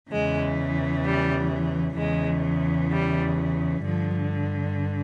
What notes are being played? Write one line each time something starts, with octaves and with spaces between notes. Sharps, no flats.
E2 C#3 E3 G#3
G3
E2 C#3 E3 G#3
G3
G2 D3 F3